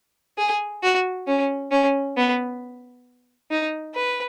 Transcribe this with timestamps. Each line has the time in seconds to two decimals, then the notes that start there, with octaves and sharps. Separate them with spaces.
0.38 G#4
0.82 F#4
1.27 C#4
1.71 C#4
2.17 B3
3.50 D#4
3.94 B4